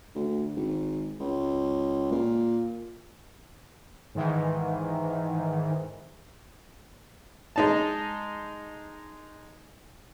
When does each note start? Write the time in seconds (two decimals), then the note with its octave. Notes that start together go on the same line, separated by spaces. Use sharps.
0.15 D2
0.56 G#1
1.20 C#2
2.12 A#2
4.15 G#2 D#3 E3
7.56 G#3 D#4 A5